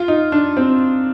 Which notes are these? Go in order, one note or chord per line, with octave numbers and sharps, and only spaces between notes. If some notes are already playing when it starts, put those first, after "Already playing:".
Already playing: F4
D#4
D4
C4